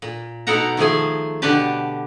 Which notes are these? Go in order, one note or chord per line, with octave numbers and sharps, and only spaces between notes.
A#2
B2 D#4 A4 A#4 F#5 A#5
D#3 F3 A3 G#4 G#5
B2 D3 D4 G4 B4 A5